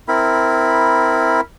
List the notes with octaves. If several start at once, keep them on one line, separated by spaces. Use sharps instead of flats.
C4 E4 A#4 B5